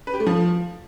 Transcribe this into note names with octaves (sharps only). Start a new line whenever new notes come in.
B4
G4
A3
F3